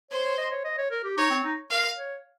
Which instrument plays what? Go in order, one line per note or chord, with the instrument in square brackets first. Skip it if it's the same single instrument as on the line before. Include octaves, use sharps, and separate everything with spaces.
[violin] C5 [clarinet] C#5
[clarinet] C#5
D#5
C#5
D#5
C#5
A#4
G4
[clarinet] D#4 [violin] C#5
[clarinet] C4
D#4
[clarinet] A#4 [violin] F5
[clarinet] C#5